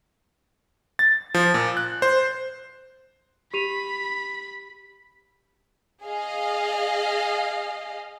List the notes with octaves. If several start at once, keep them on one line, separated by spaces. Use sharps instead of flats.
A6
F3
A#2
F#6
C5
G4 B5 D#7 F7
G#4 D#5 F5